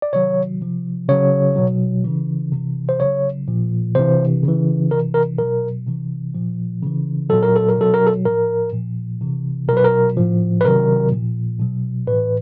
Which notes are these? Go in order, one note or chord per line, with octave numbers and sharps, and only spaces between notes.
D5
C3 D#3 F#3 C#5
C3 F3
C#3 F#3 C#5
B2 F#3
C#3 E3
C3 E3
C5
C#3 F#3 C#5
A#2 F3
C3 E3 C5
C#3
E3
C3 E3 A#4
A#4
B2 F#3 A#4
C3 E3
A#2 F3
C#3 E3
A#2 F#3 A4
A#4
A4
A#4
B2 F#3 A4
A#4
A4
A2 F3 A#4
A#2 F3
C3 E3
B2 F#3 A#4 B4
A#4
A2 F3
B4
C3 D#3 F#3 A#4
A#2 F3
B2 F#3
A2 E3 B4